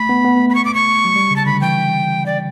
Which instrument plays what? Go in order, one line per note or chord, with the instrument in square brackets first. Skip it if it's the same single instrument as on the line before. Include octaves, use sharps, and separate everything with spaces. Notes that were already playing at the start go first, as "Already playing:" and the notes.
Already playing: [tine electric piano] A3 [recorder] B5
[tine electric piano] B3
B3
A3
[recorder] B5
C#6
D6
C#6
[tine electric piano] F#3
G3
C#3
[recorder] A5
[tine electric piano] D3 [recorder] B5
[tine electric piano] E3 [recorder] G5
[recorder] D5